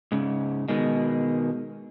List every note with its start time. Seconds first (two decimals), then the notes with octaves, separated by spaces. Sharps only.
0.12 G#2 C#3
0.69 B2 D#3 G#3